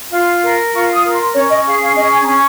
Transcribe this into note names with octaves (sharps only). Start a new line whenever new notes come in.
F4 C6
A#4
F4 C#6
D#6
A#4
C6
C#4 C#5
D#5
G#4 F5
F5
C#4 D#5
G#5
A#5
C#4 G#5